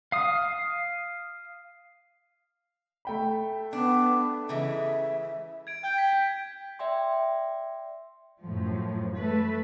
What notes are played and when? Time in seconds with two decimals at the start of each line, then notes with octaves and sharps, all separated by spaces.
0.12 F5 D#6
3.05 A3 G5 B5
3.73 B3 D4
4.49 C#3 E3 G#3 E5
5.67 G#6 D7
5.84 G5 G6
5.98 B6
6.79 D5 E5 G5 C6
8.42 F#2 A2 F3
9.18 A3 B4